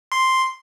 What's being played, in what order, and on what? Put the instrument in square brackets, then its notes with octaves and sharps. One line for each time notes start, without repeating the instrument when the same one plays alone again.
[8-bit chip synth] C6